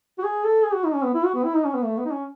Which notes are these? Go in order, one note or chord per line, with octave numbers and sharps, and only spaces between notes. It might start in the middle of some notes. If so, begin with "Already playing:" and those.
F#4
G#4
A4
G#4
F#4
D#4
C#4
B3
E4
F#4
B3
E4
D#4
C#4
B3
A3
B3
D#4
C#4